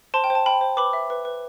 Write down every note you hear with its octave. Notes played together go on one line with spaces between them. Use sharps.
C5 A5 C6
G5
C5
A5
G5 B5
C5
B4 B5 D6
E5
B4
B4